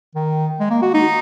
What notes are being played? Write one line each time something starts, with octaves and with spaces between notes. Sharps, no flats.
D#3
G#3
A#3
F#4
D#4